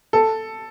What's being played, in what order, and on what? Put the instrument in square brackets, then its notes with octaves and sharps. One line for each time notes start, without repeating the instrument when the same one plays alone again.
[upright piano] A4